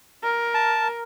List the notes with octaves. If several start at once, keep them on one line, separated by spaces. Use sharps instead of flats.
A#4
A5